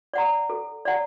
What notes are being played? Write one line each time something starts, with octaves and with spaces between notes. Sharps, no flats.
D5 F#5 A#5
A4
D5 F#5 A#5